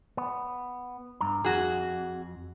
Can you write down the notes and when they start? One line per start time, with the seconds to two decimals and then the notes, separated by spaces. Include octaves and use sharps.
0.17 B3
1.21 G2 A#5
1.44 F2 F#4 G#4